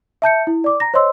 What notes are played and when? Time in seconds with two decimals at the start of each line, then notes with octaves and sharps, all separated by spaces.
0.22 E5 A5 G6 C#7
0.47 E4
0.64 D5 D6
0.80 A#5 A#6
0.94 C5 C#5 D#5 C6 E6